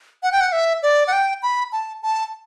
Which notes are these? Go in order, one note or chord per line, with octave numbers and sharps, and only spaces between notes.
F#5
G5
F#5
E5
D5
F#5
G5
B5
A5
A5